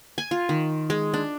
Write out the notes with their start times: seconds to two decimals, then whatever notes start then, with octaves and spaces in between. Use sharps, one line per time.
0.18 G#5
0.31 F4
0.49 D#3
0.90 G#3
1.14 D4